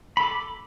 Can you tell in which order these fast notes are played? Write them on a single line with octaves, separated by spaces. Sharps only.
B5 A4 D6